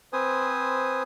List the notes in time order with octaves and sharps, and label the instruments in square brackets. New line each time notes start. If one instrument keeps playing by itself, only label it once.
[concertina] C4 B4 C5 G#5 D#6